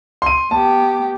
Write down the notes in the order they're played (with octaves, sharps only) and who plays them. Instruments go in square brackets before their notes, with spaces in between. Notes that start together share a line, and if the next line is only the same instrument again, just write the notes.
[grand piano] C6 D#7
[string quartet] B3 G4 [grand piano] A5